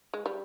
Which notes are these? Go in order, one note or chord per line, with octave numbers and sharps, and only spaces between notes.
G#3
G3